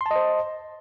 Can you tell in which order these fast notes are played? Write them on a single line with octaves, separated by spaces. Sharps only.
C6 A5 D#5 C5